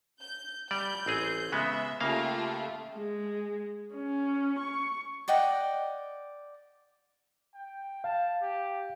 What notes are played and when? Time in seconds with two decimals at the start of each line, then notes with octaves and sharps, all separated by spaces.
0.21 G6
0.71 G3 D5 G6
1.06 A1 C4 G#4
1.52 C#3 G#3 B3 E5
2.00 C#3 A3 A#3 F4 G4 F5
2.96 G#3
3.94 C#4
4.59 C#6
5.28 D5 D#5 F#5 G5
7.54 G5
8.04 F5 A5
8.41 G4